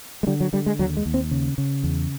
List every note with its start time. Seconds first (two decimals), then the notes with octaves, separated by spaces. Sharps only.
0.23 G#3
0.27 D3 G3
0.40 F#3
0.53 D3 G3
0.66 G#3
0.79 D#2 F#3
0.97 G#3
1.06 D#2
1.14 C4
1.31 C#3
1.58 C#3
1.83 E2